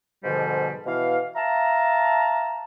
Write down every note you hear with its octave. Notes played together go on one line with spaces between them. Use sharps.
G#2 B2 D3 F3 G3
B2 E3 F5
E5 F5 A5 A#5